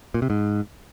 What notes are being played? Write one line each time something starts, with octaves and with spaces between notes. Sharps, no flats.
A#2
C3
G#2